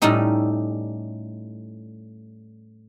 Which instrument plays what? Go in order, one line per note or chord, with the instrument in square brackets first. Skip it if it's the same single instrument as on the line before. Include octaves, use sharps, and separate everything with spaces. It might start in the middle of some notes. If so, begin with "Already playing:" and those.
[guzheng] A2 G3 A3 C#4 D#4 G4